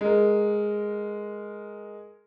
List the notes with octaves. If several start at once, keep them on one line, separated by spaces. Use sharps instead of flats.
G#3 A#4